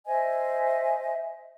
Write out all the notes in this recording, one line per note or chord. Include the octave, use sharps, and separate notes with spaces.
C5 D#5 E5 G#5